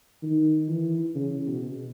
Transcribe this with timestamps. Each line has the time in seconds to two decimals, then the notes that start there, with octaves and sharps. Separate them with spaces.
0.23 D#3
0.69 E3
1.15 C#3
1.47 B2